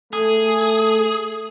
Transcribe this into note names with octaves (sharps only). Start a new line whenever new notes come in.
A3 G#4